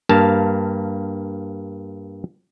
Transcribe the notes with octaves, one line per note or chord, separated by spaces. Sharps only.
G2 A#3 F5 A5